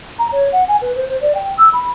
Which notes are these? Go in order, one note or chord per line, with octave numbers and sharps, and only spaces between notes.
A#5
C#5
F#5
G#5
B4
C5
C5
D5
G5
E6
B5